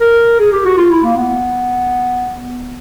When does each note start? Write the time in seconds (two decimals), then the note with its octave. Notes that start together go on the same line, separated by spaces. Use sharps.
0.01 A#4
0.39 G#4
0.52 G4
0.65 F#4
0.78 F4
0.91 E4
1.04 A#3
1.17 B3